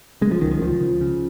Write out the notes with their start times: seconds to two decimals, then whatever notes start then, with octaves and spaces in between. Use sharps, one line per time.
0.21 C#3 G#3
0.31 F3
0.41 C#2 D#3
0.51 D#3
0.61 C#2 F3
0.81 C#3
1.01 C#3